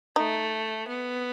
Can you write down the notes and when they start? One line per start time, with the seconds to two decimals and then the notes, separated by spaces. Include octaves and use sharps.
0.16 A3 D#4
0.87 B3